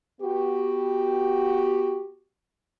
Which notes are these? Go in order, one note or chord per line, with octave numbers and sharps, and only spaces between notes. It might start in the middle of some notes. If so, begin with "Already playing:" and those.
B3 F#4 G4